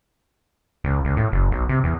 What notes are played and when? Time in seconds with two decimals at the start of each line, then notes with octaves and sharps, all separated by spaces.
0.84 C#2
1.05 C#2
1.17 A2
1.32 F#1
1.51 B1
1.69 C3
1.84 E2